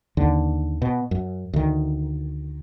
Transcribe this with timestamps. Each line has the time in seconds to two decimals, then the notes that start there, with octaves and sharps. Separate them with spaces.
0.17 D#2 D3
0.82 B2
1.11 F#2
1.53 D2 D#3